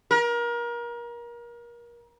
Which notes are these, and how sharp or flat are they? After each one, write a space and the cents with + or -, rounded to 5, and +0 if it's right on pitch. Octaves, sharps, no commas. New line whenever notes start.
A#4 +30